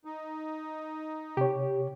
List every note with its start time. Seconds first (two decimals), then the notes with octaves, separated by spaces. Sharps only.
0.05 D#4
1.37 C3 G4 C#5